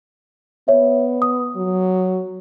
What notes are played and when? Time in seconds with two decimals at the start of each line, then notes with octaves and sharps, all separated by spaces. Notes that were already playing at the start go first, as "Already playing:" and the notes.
0.68 B3 C#5 E5
1.22 D#6
1.56 F#3